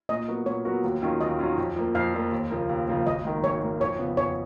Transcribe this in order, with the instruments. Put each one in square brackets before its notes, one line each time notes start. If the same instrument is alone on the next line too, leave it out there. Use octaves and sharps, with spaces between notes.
[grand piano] A#2 [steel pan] D#5
[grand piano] F#3 B3 F#4 A#4
[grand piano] A#2 [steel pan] C#5
[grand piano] F#3 B3 F#4 A#4
D#2
D#3 F#3 C#4 F4
[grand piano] D#2 [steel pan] D#5
[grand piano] D#3 F#3 C#4 F4
F2
F3 A#3
[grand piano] F2 [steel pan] F5
[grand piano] F3 A#3
D#2
C#3 F3 A#3
D#2
C#3 F3 A#3
[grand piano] G#1 [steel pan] D#5
[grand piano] G#2 D#3 A#3
[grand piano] G#1 [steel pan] C#5
[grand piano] G#2 D#3 A#3
[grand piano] F2 [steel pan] C#5
[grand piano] C#3 F3 B3
[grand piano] F2 [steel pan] C#5